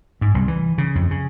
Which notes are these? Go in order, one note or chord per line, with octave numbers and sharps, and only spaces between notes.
G#2
C2
E3
C#3
F2
C#3